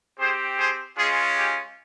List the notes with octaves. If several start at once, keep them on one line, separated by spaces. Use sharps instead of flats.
C4 G4 G#4 C5
G#4 C5
G#3 C#4 F4 G#4
G4